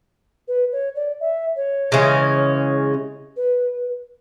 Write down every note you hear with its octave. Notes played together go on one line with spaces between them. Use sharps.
B4
C#5
D5
E5
C#5
C#3 E3 G#3 C#4
B4